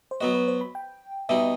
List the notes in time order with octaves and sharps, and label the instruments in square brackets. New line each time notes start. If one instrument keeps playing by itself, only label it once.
[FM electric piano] C5
[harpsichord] F#3 B3 F#4 [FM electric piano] D#5
[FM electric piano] B4
C5
B5
G5
[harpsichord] B2 G3 D#4 [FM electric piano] E5